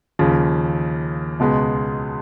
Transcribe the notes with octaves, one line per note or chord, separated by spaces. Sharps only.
D#2 C#3 F3
C#2 B2 G#3 B3